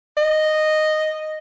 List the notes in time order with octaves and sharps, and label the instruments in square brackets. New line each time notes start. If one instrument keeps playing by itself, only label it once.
[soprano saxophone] D#5